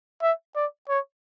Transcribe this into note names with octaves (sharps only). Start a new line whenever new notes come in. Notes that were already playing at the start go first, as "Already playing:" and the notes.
E5
D5
C#5